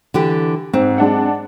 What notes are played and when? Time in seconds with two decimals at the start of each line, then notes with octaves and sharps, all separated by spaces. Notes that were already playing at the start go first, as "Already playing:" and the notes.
0.14 D3 E3 G4
0.73 G#2 C4
0.98 G#3 D4 F#5